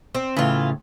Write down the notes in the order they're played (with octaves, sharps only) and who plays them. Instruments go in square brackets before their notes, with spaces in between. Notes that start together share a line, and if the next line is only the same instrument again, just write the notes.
[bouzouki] C4
[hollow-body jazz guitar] A2 C#3 [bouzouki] E3 F4